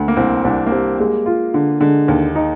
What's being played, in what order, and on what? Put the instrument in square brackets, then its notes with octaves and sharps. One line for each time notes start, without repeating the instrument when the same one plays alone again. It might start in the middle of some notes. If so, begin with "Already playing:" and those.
Already playing: [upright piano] D2
[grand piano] A#3
[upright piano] C2 [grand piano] C4
[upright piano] C2 [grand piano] D4
[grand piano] A#3
[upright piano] G3 [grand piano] C4
[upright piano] G#3 [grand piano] A#3
[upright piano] F4
D3
[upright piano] D3 [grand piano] G#3
[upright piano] D#2
D#4